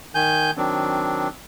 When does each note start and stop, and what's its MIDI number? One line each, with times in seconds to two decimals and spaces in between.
0.15 0.51 51
0.15 0.51 80
0.15 0.51 91
0.57 1.28 51
0.57 1.28 54
0.57 1.28 60
0.57 1.28 62